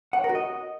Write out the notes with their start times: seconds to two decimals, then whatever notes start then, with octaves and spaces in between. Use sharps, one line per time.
0.13 F#5
0.19 C#5
0.24 A#4
0.29 F#4
0.35 D#5